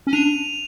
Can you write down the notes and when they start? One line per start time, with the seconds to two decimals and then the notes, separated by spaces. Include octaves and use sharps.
0.07 C#4
0.13 D4 D#7 F7